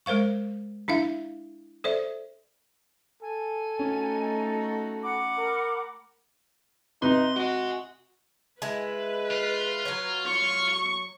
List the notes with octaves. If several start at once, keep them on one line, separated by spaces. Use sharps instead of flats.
G#3 A#4 C5 F5 C#6
D4 E4 E5 F5
A4 C5 D5 E5
A4 G#5
A3 C#4 D#4 F#4
F#5 B5 D6
A#4
C3 D#4 B4 C6
F#4 D#5 G#5
G#3 E4 B4
F4
F#3 C#5
C#6